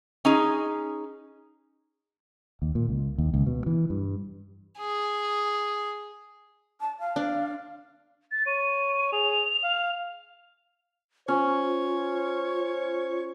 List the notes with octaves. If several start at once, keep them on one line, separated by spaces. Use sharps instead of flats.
C#4 D#4 G#4
D#2
A#2
C#2
D#2
C#2
B2
E3
G2
G#4
A5
F5
D4
A6
C#5 D#7
G#4 F7
F5
C#4 F4 C5 C#5